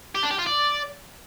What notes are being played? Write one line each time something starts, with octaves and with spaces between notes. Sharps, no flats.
G4
D4
G4
F4
D5